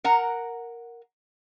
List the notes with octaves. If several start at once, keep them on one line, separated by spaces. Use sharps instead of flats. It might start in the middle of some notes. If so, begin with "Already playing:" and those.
A#4 F#5 A#5